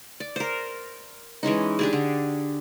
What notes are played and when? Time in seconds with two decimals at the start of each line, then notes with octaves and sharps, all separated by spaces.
0.20 D5
0.36 A#4 C5
1.43 E3 G#3 C#4 D#4
1.79 D4 G4 G#4
1.93 D3